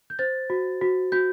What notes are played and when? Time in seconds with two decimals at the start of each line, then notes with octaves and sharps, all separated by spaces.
0.10 G6
0.19 C5 A6
0.50 F#4
0.82 F#4
1.12 F#4 G6